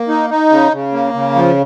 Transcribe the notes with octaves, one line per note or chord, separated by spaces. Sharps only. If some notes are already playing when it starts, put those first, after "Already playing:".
Already playing: A#3
D#4
D#4
C#3
C#3
A#3
C#3
F3